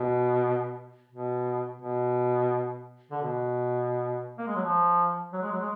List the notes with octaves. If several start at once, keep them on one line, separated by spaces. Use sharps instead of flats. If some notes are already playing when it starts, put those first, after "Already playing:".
Already playing: B2
B2
B2
D3
B2
A#3
G#3
F#3
F3
F#3
G#3
F#3
G#3